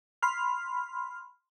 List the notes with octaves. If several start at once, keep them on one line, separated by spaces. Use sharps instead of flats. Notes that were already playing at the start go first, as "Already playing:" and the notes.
B5 C6 F6